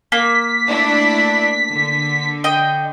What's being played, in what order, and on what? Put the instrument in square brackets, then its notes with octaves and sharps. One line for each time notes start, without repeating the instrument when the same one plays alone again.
[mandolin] A#3 [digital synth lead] B6
[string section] A3 D4 E4
D3
[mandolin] D#5 G5